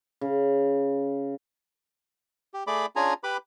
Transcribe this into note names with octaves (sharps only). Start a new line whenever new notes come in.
C#3
G4
A3 G#4 D5 B5 D6
C#4 D4 F4 G#4 G#5 A#5
G4 B4 B5 D6